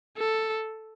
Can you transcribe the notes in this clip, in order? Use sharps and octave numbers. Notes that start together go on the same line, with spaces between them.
A4